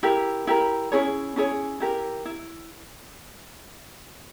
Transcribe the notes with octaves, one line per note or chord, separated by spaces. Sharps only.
E4 G4 A#4
E4 G4 A#4
C#4 E4 G#4 C#5
C#4 E4 G#4 C#5
E4 G4 A#4
E4